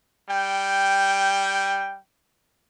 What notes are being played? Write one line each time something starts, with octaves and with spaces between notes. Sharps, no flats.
G3 G5